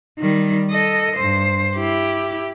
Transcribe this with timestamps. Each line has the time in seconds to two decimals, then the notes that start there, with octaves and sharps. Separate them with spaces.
0.19 D#3 G3
0.71 A4 D#5
1.16 G2 C5
1.75 E4 G4